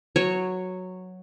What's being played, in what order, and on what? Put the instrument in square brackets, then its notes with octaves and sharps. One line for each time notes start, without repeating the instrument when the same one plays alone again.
[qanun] F#3 C#5